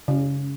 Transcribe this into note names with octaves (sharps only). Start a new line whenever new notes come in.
C#3